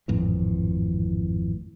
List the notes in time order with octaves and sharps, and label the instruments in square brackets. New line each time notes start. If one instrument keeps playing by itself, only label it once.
[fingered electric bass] G#1 F2 A2 E3